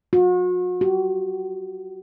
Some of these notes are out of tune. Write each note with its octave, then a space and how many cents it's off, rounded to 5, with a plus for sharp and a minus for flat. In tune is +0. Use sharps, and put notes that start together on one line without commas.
F#4 -40
F#4 +40